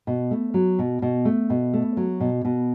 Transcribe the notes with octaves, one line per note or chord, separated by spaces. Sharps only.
B2
A3
F#3
B2
B2
A3
B2
A3
F#3
B2
B2